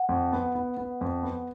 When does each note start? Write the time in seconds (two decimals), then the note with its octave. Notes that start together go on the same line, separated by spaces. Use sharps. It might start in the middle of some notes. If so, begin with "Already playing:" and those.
Already playing: F#5
0.09 F2
0.32 B3
0.55 B3
0.77 B3
1.01 F2
1.23 B3